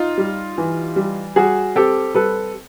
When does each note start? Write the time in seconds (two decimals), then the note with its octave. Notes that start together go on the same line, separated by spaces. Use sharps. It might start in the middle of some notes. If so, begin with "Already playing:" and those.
Already playing: D#4 F4
0.18 G3
0.58 E3
0.96 G3
1.36 G3 F#4 G#4
1.75 C4 G4 A4
2.15 G3 A4 B4